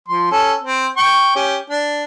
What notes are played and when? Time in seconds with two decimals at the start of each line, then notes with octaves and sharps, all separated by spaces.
0.09 F3 C6
0.31 C#4 A4
0.62 C4
0.97 G5 C#6
1.36 C#4 G4
1.70 D4